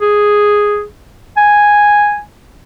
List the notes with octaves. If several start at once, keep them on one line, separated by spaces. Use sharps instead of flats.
G#4
G#5